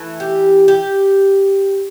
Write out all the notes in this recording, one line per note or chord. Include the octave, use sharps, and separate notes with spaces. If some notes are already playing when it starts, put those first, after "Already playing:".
Already playing: E3 A3
G4
G4